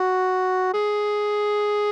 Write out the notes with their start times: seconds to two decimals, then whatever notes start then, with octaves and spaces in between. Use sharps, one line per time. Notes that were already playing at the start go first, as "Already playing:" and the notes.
Already playing: F#4
0.73 G#4